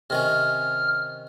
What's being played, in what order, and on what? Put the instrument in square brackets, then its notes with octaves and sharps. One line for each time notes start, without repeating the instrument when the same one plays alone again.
[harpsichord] C3 D#3 C#4 [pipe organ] F6